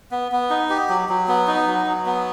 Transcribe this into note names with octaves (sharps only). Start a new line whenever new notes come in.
B3
B3
D#4
G4
F#3
F#3
B3
D#4
F#3
F#3
B3